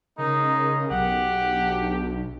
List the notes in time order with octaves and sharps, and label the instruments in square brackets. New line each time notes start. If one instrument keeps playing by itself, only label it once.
[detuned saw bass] C#3 [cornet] G#3 [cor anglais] D#4 [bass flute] A#4
[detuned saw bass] B1 [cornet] G4 [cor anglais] F#5
[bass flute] D4